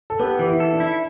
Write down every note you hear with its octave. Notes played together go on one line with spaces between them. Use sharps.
A4
B3 G4 B4
E3
E4
A4
D4
E4